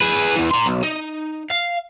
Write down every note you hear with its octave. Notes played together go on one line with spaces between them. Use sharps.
G#4 B4
E2 E3
A#5 C6
B1
D#4
F5